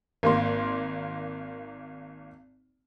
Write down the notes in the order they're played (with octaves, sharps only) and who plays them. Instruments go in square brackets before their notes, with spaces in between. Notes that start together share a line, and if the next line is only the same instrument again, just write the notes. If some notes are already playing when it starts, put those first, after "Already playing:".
[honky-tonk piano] G#1 A#3 C6